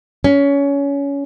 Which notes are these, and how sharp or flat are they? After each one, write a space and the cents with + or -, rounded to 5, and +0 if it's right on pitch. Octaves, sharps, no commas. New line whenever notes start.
C#4 +25